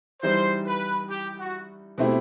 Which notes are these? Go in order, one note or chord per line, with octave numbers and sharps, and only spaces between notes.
E3 G3 D#4 C5
B4
G4
F#4
B2 A3 C4 E4 G4